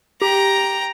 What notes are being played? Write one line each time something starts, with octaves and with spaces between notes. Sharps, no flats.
G4 G5 A#5